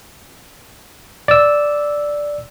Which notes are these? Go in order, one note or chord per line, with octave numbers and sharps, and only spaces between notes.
D5 E6